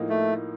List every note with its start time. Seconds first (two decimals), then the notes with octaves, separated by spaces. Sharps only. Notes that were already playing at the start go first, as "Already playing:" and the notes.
Already playing: A2 F3 A#3 D#4
0.09 A3